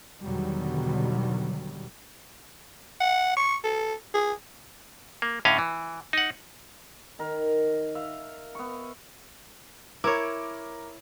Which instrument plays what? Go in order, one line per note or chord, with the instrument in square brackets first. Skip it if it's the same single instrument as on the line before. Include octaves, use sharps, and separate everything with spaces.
[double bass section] E2 B2 D3 D#3 F#3 G3
[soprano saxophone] F#5
C#6
A4
G#4
[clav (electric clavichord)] A#3
A2 D3 C#4 D#5 F5
E3
D#4 F#5
[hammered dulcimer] D#3 A#4
E5 F5
B3 C#6
[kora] E4 C#5 [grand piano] A#4 D6